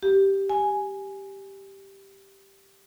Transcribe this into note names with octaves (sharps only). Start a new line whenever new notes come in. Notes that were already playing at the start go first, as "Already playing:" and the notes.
G4
G#5